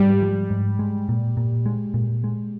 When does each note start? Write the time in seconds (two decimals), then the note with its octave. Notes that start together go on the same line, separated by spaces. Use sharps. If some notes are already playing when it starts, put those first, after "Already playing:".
Already playing: G#2 G3
0.22 F3
0.50 G#2
0.79 G#3
1.09 A#2
1.37 A#2
1.66 G#3
1.94 A#2
2.24 G#3